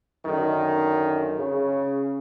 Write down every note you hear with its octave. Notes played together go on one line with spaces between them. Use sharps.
F#2 D3 D#3
C#3